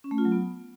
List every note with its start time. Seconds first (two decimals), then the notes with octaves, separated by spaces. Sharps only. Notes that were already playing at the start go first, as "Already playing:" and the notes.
0.04 C#4
0.11 A3
0.18 F4
0.25 F#3
0.32 B3